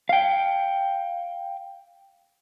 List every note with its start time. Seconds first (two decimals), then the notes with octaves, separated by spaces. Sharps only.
0.09 F5 G5